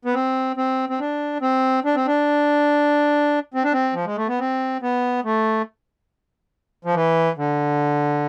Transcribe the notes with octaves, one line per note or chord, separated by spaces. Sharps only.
B3
C4
C4
C4
D4
C4
D4
C4
D4
C4
D4
C4
F3
G#3
A3
B3
C4
B3
A3
F3
E3
D3